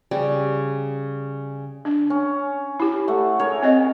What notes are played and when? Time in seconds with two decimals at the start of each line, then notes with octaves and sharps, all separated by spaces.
0.11 C#3 G3
1.85 D4
2.10 C#4
2.80 E4 G4
3.08 A3 F#5
3.40 G#4 A#4 C#5
3.63 C4 D#5